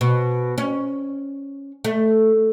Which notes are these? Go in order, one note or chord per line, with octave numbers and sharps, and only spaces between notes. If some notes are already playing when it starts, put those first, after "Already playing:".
B2
C#4
A3